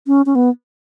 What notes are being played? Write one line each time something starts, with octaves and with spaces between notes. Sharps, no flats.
C#4
C#4
B3